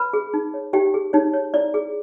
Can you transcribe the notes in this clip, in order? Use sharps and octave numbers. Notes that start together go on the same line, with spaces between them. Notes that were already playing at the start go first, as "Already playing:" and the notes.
Already playing: B4 B5
G#4
D#4
C#5
D#4 G4 G5
G#4
D#4 C#5
C#5
E4 D5
G#4